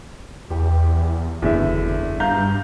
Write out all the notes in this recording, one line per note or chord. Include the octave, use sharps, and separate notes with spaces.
E2 G4
F#1 E2 D3 E5
G2 F5 A#5 G6